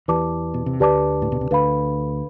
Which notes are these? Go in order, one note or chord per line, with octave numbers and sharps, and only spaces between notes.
E2 E3 G4 B4 D5 A5 D6
B2
C3
D2 D3 G4 B4 D5 A5 D6
A2
B2
C3
D2 D3 B4 F5 B5